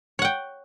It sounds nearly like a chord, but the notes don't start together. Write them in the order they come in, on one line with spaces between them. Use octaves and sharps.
C#5 F#5 G5